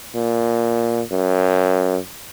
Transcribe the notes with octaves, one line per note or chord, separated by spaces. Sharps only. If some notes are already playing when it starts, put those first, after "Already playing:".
A#2
F#2